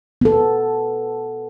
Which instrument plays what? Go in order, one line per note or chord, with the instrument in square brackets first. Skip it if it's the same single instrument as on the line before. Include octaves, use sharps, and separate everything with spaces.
[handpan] B3 A4